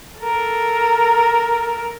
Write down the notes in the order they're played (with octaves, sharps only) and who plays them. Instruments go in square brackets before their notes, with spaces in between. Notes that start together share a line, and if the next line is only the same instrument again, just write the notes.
[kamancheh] A4 A#4